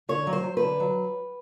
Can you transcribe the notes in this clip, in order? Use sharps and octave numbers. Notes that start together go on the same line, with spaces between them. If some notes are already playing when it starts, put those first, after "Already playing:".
D3 C#5
F#3
C5
F#3
B4
D3
F#3